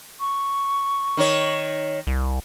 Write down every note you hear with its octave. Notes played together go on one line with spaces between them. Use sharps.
C#6
D#3 D#4 C#5
C2